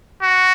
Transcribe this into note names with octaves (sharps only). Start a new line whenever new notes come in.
F#4